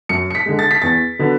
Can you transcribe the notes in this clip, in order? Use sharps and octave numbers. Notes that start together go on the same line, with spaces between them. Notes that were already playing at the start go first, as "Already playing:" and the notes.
F#2 C#7
C#7
B6
D3 G#3
A6
B6
E2 A6
D3 F#3 B3